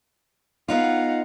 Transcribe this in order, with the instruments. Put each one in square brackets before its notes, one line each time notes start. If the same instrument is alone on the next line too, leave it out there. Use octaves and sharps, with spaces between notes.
[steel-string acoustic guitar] B3 D#4 F4 [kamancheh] F5 F#5